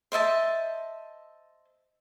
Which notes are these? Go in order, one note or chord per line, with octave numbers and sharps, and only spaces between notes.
C5 D#5 E5 A5